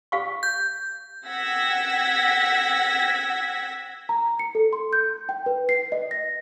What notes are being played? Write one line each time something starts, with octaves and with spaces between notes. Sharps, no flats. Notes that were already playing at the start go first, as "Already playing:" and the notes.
G4 F5 C#6
G6
F#5 G5 E6 G#6 A#6 B6
A#5
C#7
A4
C6
G6
G5
B4
C7
D#5
A#6